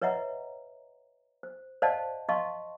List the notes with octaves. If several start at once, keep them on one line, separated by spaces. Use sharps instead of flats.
B4 C#5 D#5 E5 F#5 A#5
C5
C5 D5 D#5 F5 F#5 A5
D#5 F5 A5 C6 C#6